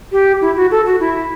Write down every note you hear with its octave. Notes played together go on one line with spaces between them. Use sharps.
G4
E4
F#4
A4
F#4
E4